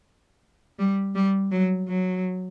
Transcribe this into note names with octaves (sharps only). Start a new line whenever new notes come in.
G3
G3
F#3
F#3